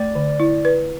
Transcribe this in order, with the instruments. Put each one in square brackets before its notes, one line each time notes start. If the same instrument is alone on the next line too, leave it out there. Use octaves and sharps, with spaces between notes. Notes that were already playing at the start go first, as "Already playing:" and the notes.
Already playing: [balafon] A3 [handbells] D5
[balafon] D3
E4
B4